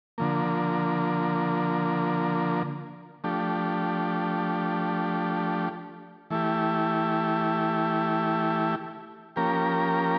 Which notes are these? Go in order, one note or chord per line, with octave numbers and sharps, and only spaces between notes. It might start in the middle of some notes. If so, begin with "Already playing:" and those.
D3 F3 A#3
F3 A3 D4 G4
E3 A3 E4 G4
F3 A#3 C#4 G4 A#4